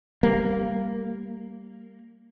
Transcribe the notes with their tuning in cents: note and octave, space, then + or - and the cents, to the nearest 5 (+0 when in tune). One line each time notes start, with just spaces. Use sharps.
G3 +0 A#3 -10